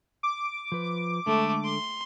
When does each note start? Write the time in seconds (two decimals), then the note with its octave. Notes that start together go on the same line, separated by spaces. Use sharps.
0.23 D6
0.72 F3 B4
1.27 D3 G#3 A3 A4
1.65 C6